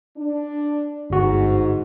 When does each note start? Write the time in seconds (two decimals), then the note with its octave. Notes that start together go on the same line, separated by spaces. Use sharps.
0.17 D4
1.10 G1 G#2 F#4